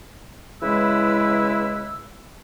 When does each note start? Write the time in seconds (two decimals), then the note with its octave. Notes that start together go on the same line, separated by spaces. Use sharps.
0.61 C#3 E3 G#3 E4 B4 E6